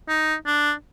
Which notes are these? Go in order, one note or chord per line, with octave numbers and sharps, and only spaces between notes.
D#4
D4